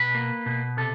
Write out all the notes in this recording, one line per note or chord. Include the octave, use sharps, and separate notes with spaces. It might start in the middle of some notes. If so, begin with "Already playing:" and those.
Already playing: B2 B4
A#3
B2
C3 A4